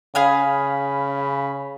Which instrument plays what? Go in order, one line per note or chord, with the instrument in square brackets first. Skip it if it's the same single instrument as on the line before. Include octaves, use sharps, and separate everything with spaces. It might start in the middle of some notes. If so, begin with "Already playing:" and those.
[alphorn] C#3 [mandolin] G#4 F5 G#5 [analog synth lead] B5